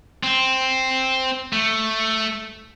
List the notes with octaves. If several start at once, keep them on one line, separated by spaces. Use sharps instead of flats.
C4
A3